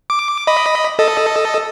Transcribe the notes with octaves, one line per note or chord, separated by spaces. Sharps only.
D6
D#5 B5
A4 D#5